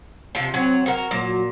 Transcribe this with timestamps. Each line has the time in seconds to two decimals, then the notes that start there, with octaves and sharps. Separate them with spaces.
0.35 C3 F3
0.54 F#3 C4
0.86 F#4 A#4
1.11 A#2 F#3